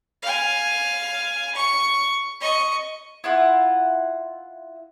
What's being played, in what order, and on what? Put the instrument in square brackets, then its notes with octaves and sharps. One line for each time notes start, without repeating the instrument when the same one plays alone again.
[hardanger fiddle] F5 G#5
C#6
D#5 C#6
[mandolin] E4 F4 F#5